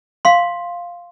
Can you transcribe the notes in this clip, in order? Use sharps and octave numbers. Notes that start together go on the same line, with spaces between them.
F5 C6